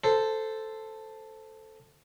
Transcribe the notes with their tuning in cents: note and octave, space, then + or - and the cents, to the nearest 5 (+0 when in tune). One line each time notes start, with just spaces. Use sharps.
A4 +0 C5 -10